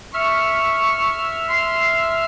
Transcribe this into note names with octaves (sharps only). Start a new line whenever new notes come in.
E5 C#6 F6
C6